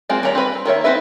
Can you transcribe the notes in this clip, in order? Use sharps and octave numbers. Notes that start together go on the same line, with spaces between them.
G#3 A#3 C4 F4 F#4
D#3 G3 C#5 A#5
C4 B4
C4
D#3 A#3 C#5 E5
C4 D#4 F#4 B4 E5